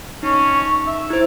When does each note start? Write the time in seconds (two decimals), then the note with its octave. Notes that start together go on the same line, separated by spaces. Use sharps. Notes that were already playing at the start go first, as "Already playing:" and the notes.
0.23 C#4 D#4 C#6
0.87 E5
1.10 E4 C5 G#6